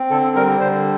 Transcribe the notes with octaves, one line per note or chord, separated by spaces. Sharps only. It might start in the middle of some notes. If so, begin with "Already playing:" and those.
Already playing: C4
D3 A4
G3 A#4
D3 C5